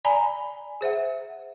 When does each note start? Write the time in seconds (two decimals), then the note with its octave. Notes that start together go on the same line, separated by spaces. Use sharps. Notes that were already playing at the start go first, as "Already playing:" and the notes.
0.05 D5 G#5 A#5 B5
0.81 G#4 C5 E5 F#5